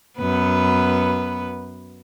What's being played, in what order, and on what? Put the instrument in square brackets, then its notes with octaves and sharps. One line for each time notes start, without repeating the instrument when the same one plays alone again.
[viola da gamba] F#2 B3 B4